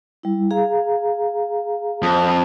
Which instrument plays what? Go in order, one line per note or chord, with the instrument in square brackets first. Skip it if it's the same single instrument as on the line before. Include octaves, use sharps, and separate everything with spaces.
[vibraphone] G3 E4
G#4 F5 A#5
[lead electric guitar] F2